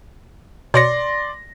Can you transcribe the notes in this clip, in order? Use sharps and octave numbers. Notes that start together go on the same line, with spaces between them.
B2 C#5 D5 C6 A#6 C#7